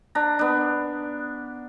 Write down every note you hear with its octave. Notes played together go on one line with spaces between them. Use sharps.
D4 A#5
B3 D4